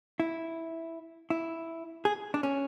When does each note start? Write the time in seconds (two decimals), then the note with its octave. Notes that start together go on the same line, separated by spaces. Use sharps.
0.20 E4
1.30 E4
2.05 G#4
2.34 D4
2.43 C#4